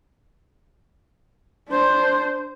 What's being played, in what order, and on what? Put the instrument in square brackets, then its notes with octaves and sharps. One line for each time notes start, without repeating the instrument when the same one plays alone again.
[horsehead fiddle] D4 C5